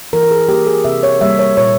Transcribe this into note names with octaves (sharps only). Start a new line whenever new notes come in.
E3 A#4
A#4
G#4
A#3 G4
G#4
C3 E5
C#5
G3 A#3 E5
C#5
A#2 C#5